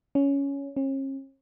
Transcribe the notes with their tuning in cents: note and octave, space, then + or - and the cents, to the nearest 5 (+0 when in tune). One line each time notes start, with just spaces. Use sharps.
C#4 +10
C#4 -40